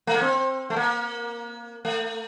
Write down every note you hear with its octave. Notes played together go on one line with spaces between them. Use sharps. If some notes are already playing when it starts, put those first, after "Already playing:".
A3
A#3
C4
A3
A#3
A3